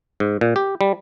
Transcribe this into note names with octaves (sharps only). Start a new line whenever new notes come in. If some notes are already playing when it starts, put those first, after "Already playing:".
G#2
A#2
G4
G3